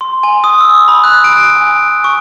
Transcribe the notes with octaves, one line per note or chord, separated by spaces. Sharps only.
C6
G#5
D#6
E6
B5
F#6
D7
G#5
C#6